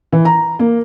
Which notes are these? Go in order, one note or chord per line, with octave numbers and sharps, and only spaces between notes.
E3
A#5
A#3